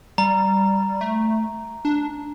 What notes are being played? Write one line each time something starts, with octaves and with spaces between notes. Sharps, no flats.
G3 A#5
A3
D4